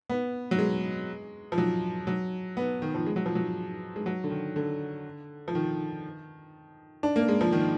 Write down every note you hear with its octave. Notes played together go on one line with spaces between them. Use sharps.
B3
F#3
G#3
F3
F#3
F#3
B3
D#3
F3
G#3
F#3
F3
F#3
G#3
F#3
D3
D#3
D3
F3
D#3
D4
A#3
G#3
F3
D#3